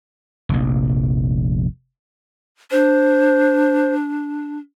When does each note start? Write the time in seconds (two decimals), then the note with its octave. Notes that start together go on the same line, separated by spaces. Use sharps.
0.49 F1 A#1
2.72 D4 C5